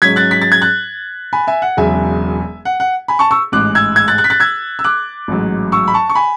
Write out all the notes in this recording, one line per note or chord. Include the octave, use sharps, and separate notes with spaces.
G#2 F#3 C#4 G#6 B6
F#6 A6
B6
A6
G#6
F#6 A6
G#5 B5
E5 G#5
F#5
E1 E2 C#3 F#3 E5 G#5
F#5
F#5
G#5 B5
A5 C#6
C#6 E6
A1 G#2 G#3 D6 F#6
E6 G#6
E6 G#6
F#6 A6
F#6 A6
B6
F#6 A6
E6 G#6
E6
D6 F#6
A1 G#2 F#3
C#6 E6
B5
A5 C#6
C#6
G#5 B5